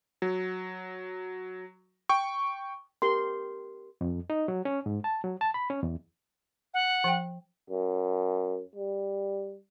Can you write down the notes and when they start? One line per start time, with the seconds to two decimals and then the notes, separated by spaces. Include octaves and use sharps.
0.22 F#3
2.09 G5 C#6
3.02 G4 A#4 C6
4.01 F2
4.30 D#4
4.48 F#3
4.65 C#4
4.86 G#2
5.04 A5
5.24 F#3
5.41 A5
5.54 B5
5.70 C#4
5.83 E2
6.74 F#5
7.04 F3 G5
7.70 F#2
8.75 G3